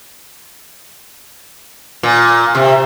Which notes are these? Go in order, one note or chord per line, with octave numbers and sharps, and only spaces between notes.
A#2
C3